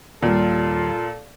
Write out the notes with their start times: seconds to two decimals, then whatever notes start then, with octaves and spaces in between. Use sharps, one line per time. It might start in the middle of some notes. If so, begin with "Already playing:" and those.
0.22 D#2 A#2 G3 F4 A4